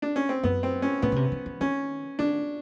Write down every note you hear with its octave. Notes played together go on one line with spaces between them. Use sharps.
D4
C#4
C4
F#2 B3
C4
C#4
A2 B3
C#3
C3
D#3
E3
D#3 C#4
D#3 D4